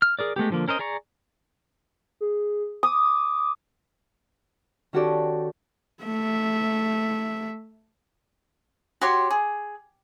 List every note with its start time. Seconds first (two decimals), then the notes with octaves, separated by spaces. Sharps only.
0.02 F6
0.19 G#4 A#4 D5
0.36 G#3 A3 B3 G4
0.50 D3 F3 A#3
0.68 C#4 A#4 C5 D#5
0.79 G#4 D5 A#5 C#6
2.21 G#4
2.83 D6 D#6
4.93 D#3 C#4 F#4 G4 A4 D5
6.03 A3 E5
9.01 F#4 G4 C#5 C6
9.31 G#4